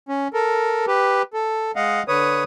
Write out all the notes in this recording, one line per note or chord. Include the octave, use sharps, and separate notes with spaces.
C#4
A4 A#4
G4 B4
A4
G#3 D#5 F5 F#5
D3 B4 C#5 D#6